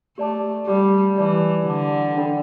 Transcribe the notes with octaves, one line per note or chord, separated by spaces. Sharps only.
A3 G4 D5 A5 D6
G3 G4 D5 A5 D6
E3 G4 D5 A5 D6
D3 G4 D5 A5 D6
D4 A4 D5 G5 B5